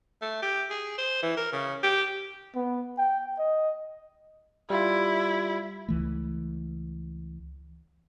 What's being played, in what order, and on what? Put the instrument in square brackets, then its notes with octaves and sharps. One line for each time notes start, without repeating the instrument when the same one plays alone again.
[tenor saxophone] A3
G4
G#4
C5
E3
A#4
C#3
G4
[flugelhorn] B3
G5
D#5
[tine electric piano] G3 F4 [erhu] E4
[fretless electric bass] C#2 E3 A3